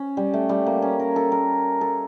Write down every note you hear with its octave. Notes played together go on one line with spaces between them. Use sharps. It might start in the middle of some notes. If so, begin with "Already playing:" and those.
Already playing: C#4
G3
A3
G3
A#3
C#4
A#4
A4
A#4
A4